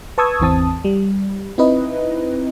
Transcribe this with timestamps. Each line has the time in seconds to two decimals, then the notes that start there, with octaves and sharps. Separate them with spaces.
0.18 B4 A5 C#6 D#6 E6 G#6
0.40 G#1 E2 E3 C4 A5 D#6
0.85 G3
1.58 C4 D#4 E4 B4 D#5